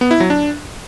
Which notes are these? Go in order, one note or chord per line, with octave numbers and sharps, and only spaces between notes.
B3
E4
F#3
D4